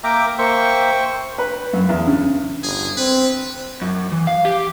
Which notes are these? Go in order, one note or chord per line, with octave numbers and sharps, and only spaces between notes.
A#3 A#4 E5 G5 A#5 D6
A#3 C5 E5 G5 C#6
B4
F#2
E2
C#3
G1 G#4
C4 B4
F#2
E3
F5
G4